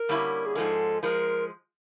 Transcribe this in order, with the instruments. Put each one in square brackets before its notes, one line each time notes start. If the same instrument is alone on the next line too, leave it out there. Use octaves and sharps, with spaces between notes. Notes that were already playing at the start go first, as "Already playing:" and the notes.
Already playing: [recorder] A#4
[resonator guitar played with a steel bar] D3 G3 A#3 C#4 E4
[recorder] G#4
[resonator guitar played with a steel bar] G#2 F3 G#3 [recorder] A4 A#4
[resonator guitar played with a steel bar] F3 G#3 [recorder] A#4